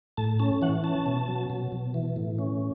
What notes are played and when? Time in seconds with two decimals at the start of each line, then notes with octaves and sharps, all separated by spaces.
0.17 A2 A5
0.40 C#4 A5
0.62 E3 F#5
0.84 C#4 A5
1.06 B2
1.28 F#3
1.50 B2
1.72 B2
1.94 E3
2.16 A2
2.39 C#4